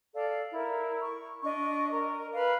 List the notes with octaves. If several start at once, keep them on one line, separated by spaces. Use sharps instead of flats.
A4 D5 F5
E4 A#4
C#6
D4 D#5 C#6
A#4
B4 F5